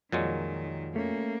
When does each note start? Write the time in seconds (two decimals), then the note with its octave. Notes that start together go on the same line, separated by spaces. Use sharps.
0.12 F2 A#2 D#3 F#3 G#3
0.96 A3 A#3 C#4